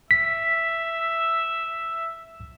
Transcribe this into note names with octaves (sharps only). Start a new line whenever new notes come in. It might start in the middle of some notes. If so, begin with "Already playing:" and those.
E5 B6